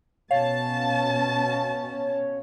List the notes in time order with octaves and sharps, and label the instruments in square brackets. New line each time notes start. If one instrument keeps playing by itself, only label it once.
[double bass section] B2 C#4 [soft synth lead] C#5 [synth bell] F5 [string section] A5